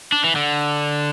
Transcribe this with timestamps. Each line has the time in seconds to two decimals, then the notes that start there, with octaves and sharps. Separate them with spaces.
0.12 D4
0.24 E3
0.36 D3